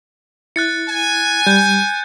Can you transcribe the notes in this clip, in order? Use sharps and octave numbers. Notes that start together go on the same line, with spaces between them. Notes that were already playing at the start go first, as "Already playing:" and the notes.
E4 F#6 A6 C#7
G#5
G3 G6